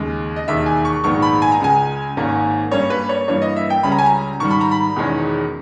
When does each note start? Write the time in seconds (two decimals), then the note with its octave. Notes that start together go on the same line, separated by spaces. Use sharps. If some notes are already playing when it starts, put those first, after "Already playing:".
Already playing: D#2 C#3 G#3
0.36 D#5
0.48 E1 D#2 D#3 E5
0.66 G#5
0.85 C#6
1.04 A#1 G#2 D#3 G#3 B3 C#6
1.22 B5
1.42 G#5
1.52 A#5
1.60 C#2 C#3 G#3 G#5
2.17 G#1 G#2 D#3 A#3 C#4
2.71 G2 G3 A#3 C#4 C#5
2.90 B4
3.09 C#5
3.28 G2 E3 A#3 C#5
3.42 D#5
3.56 E5
3.70 G5
3.83 C#2 C#3 G3 C#4 B5
3.92 A#5
3.98 G#5
4.06 A#5
4.39 G#2 D#3 G3 C#6
4.50 B5
4.61 A#5
4.71 B5
4.96 E1 E2 D#3 G#3 C#4